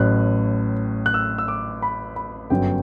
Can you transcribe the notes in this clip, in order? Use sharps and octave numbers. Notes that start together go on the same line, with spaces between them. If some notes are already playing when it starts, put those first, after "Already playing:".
Already playing: A1 A2 F#3 F#6
F#6
E6
E6
D6
B5
B5
G1 F#2 F#3 G5